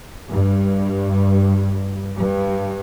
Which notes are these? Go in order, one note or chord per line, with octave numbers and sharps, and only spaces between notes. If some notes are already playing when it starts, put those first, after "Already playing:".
G2
G2